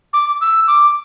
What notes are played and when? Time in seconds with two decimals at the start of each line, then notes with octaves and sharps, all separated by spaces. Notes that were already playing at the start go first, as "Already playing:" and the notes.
0.13 D6
0.41 E6
0.67 D6